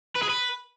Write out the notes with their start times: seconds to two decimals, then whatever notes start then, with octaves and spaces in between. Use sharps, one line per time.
0.15 B4
0.22 G#4
0.29 B4